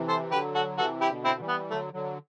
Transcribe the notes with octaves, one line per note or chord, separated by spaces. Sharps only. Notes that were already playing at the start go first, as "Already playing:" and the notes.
Already playing: C3 E3
A4 C5
D3 F#3 G4 B4
F#4 A4
C3 E3 F#4 A4
E4 G4
B2 D3
C4 E4
E3 G3
B3
D3 F#3 A3
D3 F#3